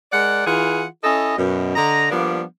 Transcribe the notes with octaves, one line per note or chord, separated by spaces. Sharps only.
G#3 A#4 D5 F#5
E3 F4 G#4 F#5
C#4 E4 A4 D#5
F#2 B2
D3 D#5 A#5
F3 G3 A#3 B3 D4